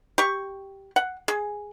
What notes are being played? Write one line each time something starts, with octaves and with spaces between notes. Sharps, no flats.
G4 C#6
F#5
G#4